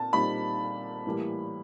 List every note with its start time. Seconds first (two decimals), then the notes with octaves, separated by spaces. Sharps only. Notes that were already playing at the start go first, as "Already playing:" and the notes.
Already playing: A#2 C4 A5
0.13 A#2 G3 C4 D#4 B5
1.06 A2 E3 G3 A#3